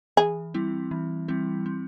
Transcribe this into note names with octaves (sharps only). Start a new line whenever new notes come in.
E3 G#4
G3 C4 E4
E3
G3 C4 E4
C4